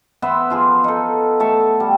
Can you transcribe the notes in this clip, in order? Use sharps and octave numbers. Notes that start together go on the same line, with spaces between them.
B3 B4 C5 E5
F3 F4 G#4
D#4 A4
A3 E5 A5 C#6
G3